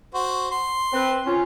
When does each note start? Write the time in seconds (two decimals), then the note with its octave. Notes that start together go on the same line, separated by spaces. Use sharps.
0.14 F#4 C5
0.51 C6
0.93 C4 B4
1.26 C#4 F4